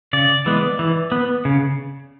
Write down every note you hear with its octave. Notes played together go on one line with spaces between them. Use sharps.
C#3 D5
E3 G#3 B3
E3
B3
C#3